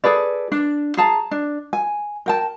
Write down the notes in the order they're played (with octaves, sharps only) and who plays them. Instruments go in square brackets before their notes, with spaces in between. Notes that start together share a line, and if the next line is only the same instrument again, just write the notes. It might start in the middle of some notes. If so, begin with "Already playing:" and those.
[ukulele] G#4 A4 B4 D5
D4
G#4 A5 A#5
D4
G#5
A#4 G5 A5